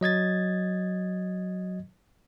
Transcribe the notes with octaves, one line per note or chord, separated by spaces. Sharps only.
F#3 D#5 G#6 A6